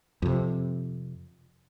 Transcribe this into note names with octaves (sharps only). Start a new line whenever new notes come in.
F2 C3